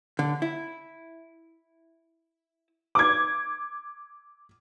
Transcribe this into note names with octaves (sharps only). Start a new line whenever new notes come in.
D3
E4
D6 G#6